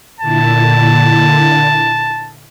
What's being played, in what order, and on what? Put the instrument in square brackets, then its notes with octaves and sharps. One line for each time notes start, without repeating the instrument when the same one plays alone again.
[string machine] A#2 D3 E4 [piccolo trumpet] A5